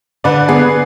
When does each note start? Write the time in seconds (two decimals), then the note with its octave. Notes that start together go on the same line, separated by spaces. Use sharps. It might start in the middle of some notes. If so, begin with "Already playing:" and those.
0.24 D3 B4 D5
0.48 B3 G#4 B4